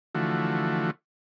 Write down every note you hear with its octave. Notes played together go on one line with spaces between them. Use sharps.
D3 E3 F3 A3 F#4